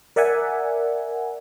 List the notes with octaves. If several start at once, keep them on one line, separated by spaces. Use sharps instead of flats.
A#4 D5 E5 F#5 G#5